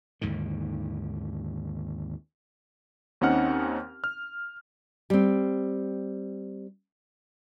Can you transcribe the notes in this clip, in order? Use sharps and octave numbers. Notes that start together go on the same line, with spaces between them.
D#2 G#2 D3 D#3
D#2 C4 C#4 D#4 F#5 F6
F6
G3 C4